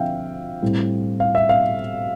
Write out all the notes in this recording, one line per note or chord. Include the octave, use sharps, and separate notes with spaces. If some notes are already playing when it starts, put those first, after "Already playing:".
Already playing: D3 F3 C4 E5 F5 G5
A2 G3 C4
F5
E5
F5